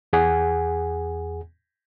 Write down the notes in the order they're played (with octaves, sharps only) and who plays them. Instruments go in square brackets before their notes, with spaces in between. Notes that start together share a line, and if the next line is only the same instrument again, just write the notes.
[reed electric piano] E2 G#4 F#5 G#5